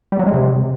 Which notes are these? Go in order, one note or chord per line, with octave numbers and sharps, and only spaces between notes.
G3
F#3
G#3
C3